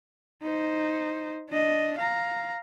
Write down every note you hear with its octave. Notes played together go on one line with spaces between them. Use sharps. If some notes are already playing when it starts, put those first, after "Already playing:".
D#4 C5
D4 D#5
F5 A#5